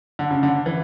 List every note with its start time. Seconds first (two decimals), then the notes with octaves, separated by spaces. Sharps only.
0.19 D3
0.31 C#3
0.43 D3
0.66 E3